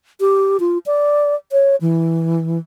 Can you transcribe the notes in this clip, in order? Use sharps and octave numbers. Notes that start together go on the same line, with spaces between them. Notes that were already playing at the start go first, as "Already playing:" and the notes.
G4
F4
D5
C#5
E3